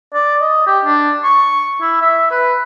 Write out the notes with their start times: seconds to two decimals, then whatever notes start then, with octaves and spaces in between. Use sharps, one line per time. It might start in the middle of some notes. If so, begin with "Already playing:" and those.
0.14 D5
0.41 D#5
0.67 G4
0.85 D4
1.24 C#6
1.81 E4
2.01 E5
2.31 B4